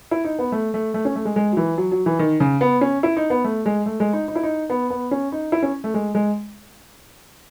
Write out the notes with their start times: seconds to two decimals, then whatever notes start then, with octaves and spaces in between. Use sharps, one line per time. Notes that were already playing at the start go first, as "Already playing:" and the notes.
0.11 E4
0.24 D#4
0.39 B3
0.52 A3
0.74 A3
0.94 A3
1.05 C#4
1.16 A3
1.25 G#3
1.36 G#3
1.52 F#3
1.57 E3
1.78 F#3
1.91 F#3
2.06 E3
2.19 D#3
2.40 C#3
2.61 B3
2.81 C#4
3.03 E4
3.17 D#4
3.30 B3
3.44 A3
3.66 G#3
3.86 A3
4.00 G#3
4.13 D#4
4.28 D#4
4.35 E4
4.43 D#4
4.70 B3
4.90 B3
5.11 C#4
5.32 D#4
5.52 E4
5.63 C#4
5.84 A3
5.94 G#3
6.15 G#3